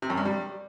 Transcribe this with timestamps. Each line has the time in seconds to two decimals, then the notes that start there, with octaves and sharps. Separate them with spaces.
0.02 C3
0.10 F#2
0.18 G2
0.25 G3